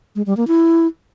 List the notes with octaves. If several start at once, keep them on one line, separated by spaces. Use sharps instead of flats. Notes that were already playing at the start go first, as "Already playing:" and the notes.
G#3
G3
A#3
E4